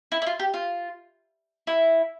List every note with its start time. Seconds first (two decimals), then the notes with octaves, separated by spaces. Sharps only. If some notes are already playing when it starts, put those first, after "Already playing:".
0.12 E4
0.22 E4
0.27 F4
0.39 G4
0.54 F4
1.67 E4